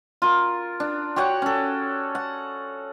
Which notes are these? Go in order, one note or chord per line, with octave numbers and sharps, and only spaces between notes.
F4 A#4
D4
F#4 G4 C#5 F#5
C#4 A4
F#5